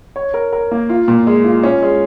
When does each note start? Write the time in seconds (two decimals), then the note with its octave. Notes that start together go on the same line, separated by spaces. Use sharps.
0.16 C#5
0.34 A#4
0.53 A#4
0.71 A#3
0.89 F4
1.08 A#2
1.27 G#3
1.44 F4
1.64 C#4
1.82 G#3